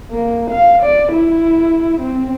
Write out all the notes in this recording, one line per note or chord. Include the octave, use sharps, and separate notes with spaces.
A#3
F5
D5
E4
C4